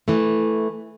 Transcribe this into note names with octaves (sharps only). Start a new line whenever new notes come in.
E3 A3